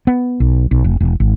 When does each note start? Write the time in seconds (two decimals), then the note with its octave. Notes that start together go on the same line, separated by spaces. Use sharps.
0.07 B3
0.40 B1
0.71 B1
0.84 F1
1.00 E1
1.20 G#1